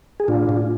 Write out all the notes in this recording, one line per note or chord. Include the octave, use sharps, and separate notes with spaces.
G#4
A2 D4 F4
A2